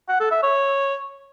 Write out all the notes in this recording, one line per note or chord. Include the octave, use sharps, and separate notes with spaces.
F#5
A4
E5
C#5